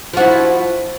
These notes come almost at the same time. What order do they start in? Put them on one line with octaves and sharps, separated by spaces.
F3 F#4 E4